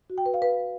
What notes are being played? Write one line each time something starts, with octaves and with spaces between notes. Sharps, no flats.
F#4
G5
B4
F5
B4